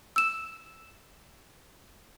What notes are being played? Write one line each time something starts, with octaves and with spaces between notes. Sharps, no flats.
E6 E7